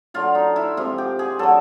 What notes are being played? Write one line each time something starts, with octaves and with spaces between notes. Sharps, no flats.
D3 F#3 F4
D#4
E4
C3 F3 G#3 F4
G4
G#4
D3 F#3 A4